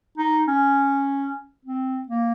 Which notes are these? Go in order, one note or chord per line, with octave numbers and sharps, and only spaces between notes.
D#4
C#4
C4
A#3